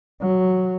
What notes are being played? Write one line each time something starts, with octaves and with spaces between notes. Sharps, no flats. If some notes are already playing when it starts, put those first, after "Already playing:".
F#3